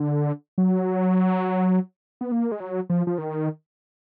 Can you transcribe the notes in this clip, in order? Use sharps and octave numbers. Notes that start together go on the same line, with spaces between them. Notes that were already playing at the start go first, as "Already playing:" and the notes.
Already playing: D3
F#3
B3
A#3
G#3
F#3
F3
F3
D#3